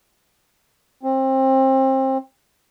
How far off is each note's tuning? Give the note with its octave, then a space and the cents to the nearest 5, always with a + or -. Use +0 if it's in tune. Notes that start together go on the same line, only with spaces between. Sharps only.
C4 +25